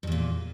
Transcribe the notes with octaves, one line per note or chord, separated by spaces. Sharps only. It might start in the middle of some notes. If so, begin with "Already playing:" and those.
E2 G2 A#2